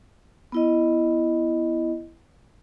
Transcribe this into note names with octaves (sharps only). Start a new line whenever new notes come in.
B3 E4 D#5